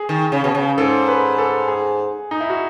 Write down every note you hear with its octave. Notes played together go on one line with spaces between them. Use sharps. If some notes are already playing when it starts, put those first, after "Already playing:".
Already playing: G#4
D#3
C#3
B2
C#3
G#2 A4
B4
A4
G#4
D#4
E4
F#4